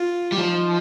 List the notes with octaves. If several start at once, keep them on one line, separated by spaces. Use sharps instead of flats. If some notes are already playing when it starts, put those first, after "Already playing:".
Already playing: F4
G3
F3 D#4